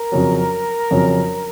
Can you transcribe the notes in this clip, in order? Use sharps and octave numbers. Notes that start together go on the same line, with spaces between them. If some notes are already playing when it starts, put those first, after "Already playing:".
Already playing: A#4
F2 C#3 F#3
F2 C#3 F#3